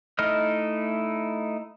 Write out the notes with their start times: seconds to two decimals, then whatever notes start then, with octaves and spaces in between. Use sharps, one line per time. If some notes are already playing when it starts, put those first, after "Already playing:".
0.19 A3 D#4 E4 D#5 F6